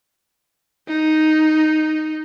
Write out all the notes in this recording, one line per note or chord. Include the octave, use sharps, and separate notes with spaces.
D#4